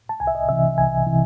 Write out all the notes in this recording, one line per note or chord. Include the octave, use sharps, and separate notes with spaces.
A5
C2 G#5
E5
D#5
C3 E3 E5
C2 G#5
C3 E3